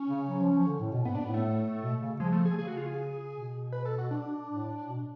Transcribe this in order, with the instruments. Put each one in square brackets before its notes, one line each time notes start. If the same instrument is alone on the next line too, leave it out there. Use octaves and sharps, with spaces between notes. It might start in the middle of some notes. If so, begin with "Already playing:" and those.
Already playing: [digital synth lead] C#4
[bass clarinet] C#3
F#3
F3
F3
D3
A2
B2
[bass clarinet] G#2 [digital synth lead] B3
[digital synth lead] D4
[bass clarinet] A2 [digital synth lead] B3
[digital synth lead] A3
[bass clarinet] B2
C#3
[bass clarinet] F3 [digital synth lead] G#3
[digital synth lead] A3
G#4
[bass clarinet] C#3 [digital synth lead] G#4
[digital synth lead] F#4
F4
G#4
[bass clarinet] B2
[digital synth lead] B4
A4
F#4
D4
[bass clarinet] A2
B2